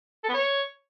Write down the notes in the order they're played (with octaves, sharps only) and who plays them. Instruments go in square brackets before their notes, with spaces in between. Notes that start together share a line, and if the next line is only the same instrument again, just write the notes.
[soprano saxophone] A4
B3
C#5